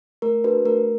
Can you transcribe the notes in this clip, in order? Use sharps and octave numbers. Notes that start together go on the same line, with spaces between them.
A3 A#4
D4 F#4 A4 B4
A3 A#4